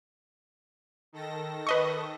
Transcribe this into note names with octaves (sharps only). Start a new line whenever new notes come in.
D#3 A4 A#6
B4 D#5 C#6